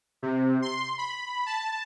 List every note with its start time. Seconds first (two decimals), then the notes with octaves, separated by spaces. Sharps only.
0.22 C3
0.62 C6
0.98 B5
1.46 A5